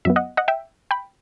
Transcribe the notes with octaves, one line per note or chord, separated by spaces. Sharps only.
F#2 F#3 B3 E5
D#5 F#5
D#5 F#5
E5 G5
G5 B5